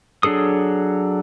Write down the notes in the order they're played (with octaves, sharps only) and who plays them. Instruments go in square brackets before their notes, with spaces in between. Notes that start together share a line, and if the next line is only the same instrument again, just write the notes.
[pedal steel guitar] F#3 D4 G#4 A4 D#6